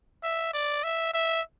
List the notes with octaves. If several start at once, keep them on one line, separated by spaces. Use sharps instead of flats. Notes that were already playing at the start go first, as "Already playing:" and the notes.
E5
D5
E5
E5